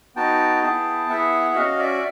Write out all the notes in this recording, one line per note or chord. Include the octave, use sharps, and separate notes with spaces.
B3 D#4 F#4 G5 A5
B3 E4 G#4 G5 A5
B3 E4 G#4 E5 F#5
C#4 F#4 D#5 F5
D5 E5